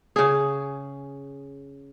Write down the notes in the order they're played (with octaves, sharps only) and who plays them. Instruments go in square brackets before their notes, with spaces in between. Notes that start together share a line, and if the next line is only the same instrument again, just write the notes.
[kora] C#3 G#4